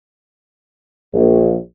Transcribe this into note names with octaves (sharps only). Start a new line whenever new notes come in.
A#1